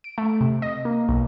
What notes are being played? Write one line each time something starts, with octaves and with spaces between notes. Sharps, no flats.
D7
A3
C3
D#5
A#3
B1